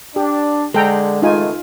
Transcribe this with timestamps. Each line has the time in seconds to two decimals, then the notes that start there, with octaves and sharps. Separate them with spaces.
0.16 D4 G4
0.74 D3 G#3 A4 G5 A#5
1.22 C#2 D#3 A3 D#4 F4 G#5